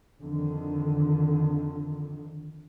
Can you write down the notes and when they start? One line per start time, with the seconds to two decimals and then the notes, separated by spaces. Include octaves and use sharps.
0.21 F2 D3 D#3